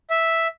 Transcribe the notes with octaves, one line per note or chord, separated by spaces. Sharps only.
E5